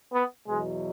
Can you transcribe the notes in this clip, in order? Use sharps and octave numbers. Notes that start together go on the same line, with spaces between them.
B3
E2 B2 F#3 G#3